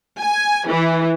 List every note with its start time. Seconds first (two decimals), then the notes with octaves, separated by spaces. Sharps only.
0.19 G#5
0.68 E3